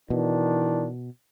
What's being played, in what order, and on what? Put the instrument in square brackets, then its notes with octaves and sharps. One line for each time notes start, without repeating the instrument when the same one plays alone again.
[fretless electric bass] B2 [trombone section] D#3 D4 [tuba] E3